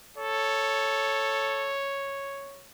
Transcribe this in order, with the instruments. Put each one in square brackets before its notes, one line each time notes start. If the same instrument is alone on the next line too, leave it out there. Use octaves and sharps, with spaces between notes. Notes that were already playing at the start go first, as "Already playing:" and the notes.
[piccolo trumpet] A4 [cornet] C#5